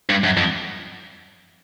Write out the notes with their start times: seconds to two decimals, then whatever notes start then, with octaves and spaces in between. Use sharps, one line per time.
0.09 G2
0.24 F#2
0.37 F2